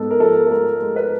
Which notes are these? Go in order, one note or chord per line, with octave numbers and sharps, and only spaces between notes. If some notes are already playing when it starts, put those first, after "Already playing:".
Already playing: G#2 B3 A4
A#4
F3 A4
A4
G#3 A#4
G#3
B4